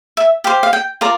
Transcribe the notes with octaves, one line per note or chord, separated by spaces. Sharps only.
E5
G4 C5 F5
F5
G5
F4 A#4 D5 A#5